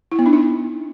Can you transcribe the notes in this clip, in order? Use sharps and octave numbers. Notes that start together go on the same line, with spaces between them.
E4
B3
D4
D#4